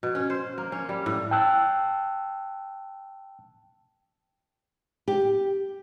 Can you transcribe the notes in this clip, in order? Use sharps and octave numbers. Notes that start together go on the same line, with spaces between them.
B2
C#4
C5
A#3
C#4
G3
A2
G5 A5 E6 F#6
G4